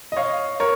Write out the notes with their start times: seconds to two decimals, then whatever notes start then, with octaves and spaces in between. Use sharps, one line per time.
0.12 D#5
0.16 C#5 F5
0.60 A#4 C#5